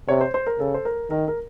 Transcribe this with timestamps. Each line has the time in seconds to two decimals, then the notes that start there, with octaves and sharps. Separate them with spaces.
0.08 C3 C#5
0.21 C5
0.34 C5
0.46 A#4
0.59 C#3 A4
0.74 C5
0.85 A#4
1.11 D#3 A#4
1.28 A#4